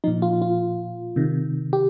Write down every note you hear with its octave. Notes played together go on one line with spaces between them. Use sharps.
A#2 F3 D#4
F4
F4
C3 D#3
G4